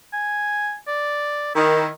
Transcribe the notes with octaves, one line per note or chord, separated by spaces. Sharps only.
G#5
D5
D#3 E4